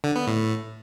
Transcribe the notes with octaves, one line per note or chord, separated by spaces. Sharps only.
D3
B3
A2